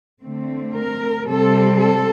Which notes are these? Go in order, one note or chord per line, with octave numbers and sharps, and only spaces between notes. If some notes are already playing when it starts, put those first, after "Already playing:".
D3 A3 C4
A#4
C3 G3 C4 A4
A4